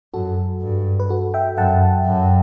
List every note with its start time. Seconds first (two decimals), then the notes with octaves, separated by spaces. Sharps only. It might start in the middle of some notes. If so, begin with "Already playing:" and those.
0.14 F#2 F#4 A4
0.61 G2
1.00 B4
1.09 F#4 A4
1.34 E5 G5
1.57 F#2 F#5 A5
2.05 F#2